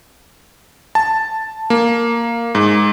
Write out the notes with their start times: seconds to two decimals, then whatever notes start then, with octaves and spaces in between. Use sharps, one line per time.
0.95 A5
1.70 A#3
2.55 G#2